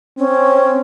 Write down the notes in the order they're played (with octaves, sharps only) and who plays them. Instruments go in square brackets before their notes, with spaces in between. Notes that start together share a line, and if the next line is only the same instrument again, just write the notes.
[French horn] C4 [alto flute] C#4